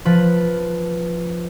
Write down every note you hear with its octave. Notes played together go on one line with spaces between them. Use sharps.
F3 B4